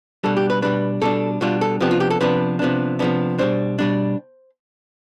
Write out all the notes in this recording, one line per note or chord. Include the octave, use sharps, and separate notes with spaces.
B2 G3 D4 A4
G4
B4
B2 G3 D4 B4
B2 G3 D4 A4
B2 G3 D4 F4
A4
C3 F3 B3 D4 G4
F4
G4
A4
C3 F3 B3 D4 B4
C3 F3 B3 D4
C3 F3 B3 D4
B2 G3 D4 C5
B2 G3 D4